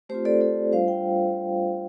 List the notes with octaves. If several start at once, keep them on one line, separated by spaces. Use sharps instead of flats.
A3 C4 F4 G4 C5
A4 D5
A4 D5
G3 D4 F4 C5 F5
G5